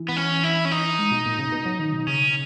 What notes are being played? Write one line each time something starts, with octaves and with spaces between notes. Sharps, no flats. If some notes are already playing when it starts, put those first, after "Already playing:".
Already playing: E3
B3
C#4
E4
C#4
D#4
G#3
B2
A#2
C#3
A#2
B2
F#3
D#3
B2
C#3 C#4